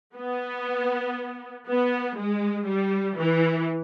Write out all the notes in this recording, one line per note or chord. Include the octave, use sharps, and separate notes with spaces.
B3
B3
G#3
G3
E3